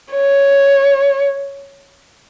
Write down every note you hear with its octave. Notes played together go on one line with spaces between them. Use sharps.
C#5